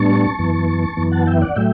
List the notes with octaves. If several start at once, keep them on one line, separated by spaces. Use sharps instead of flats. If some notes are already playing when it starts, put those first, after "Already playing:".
Already playing: A2 G3 B3 D4 A5 C#6
F#2 E3 B3
F#2 E3 B3
F#5 A5
E5 G5
D5 F#5
A2 F#3 A3 E5 G5